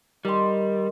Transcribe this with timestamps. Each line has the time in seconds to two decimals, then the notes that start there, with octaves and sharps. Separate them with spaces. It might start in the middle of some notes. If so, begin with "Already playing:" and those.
0.25 D#3 G3 C6